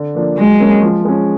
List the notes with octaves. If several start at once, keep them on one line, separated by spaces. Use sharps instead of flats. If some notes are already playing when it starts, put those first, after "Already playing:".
Already playing: D3
F3 A#3 D4
F#3 G#3
A#3 C#4
F3
G#3 C#4